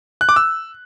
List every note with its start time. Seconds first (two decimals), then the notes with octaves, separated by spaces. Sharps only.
0.21 F#6
0.29 D6
0.36 E6